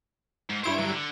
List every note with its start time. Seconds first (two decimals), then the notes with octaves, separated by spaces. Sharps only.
0.50 G#2
0.64 G2 E4 C5 C#5 D7
0.79 D3 F#3
0.95 D3